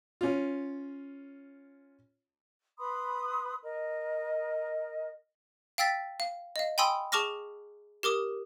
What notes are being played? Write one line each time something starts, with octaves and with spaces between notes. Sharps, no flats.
C#4 F4
B4 B5 C6 D#6
A#4 D#5
F5 G5 E6 A6 B6
F5
D#5 F5
G5 G#5 B5 C6 D#6 E6
G#4 A5 C#6 D6 F6 A#6
G4 A#4 D6 D#6